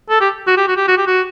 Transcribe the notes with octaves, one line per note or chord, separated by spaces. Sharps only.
A4
G4
F#4
G4
F#4
G4
F#4
G4
F#4